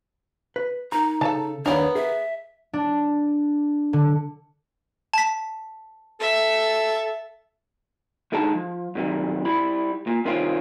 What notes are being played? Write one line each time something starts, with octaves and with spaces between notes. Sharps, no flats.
B4
D#4 A#4 A#5
C#3 A4 A5
D#2 B3 D4 A#4 C#5
G#4 E5
D4
D3
A5 B6
A4 E5
C2 D3 G#3 D#4 A5
F3
F#2 C3 D#3 G3
G3 E4 B5
A#2
G2 C3 D#3 C4 C#4 F4